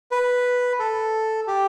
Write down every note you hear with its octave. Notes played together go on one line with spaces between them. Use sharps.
B4
A4
G4